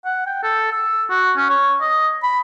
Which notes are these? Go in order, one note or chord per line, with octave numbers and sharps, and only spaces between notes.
F#5
G5
A4
E6
F#4
C#4
C#5
D#5
B5